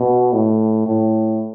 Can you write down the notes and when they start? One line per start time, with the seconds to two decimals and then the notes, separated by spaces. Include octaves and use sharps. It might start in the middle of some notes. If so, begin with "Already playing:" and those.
Already playing: B2
0.33 A2
0.86 A2